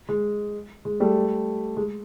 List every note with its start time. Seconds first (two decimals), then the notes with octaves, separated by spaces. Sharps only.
0.09 G#3
0.85 G#3
1.00 G3 A3
1.77 G#3